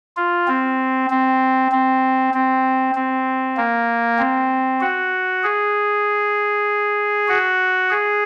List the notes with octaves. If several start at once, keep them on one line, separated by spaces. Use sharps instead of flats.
F4
C4
C4
C4
C4
C4
A#3
C4
F#4
G#4
F#4
G#4